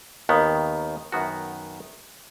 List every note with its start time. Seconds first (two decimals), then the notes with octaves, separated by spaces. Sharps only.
0.29 D#2 D#3 B3
1.12 F#2 D#3 B3 F#4